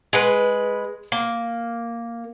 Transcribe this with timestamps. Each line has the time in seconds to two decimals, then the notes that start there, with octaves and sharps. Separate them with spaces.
0.13 G#3 B4
1.12 A#3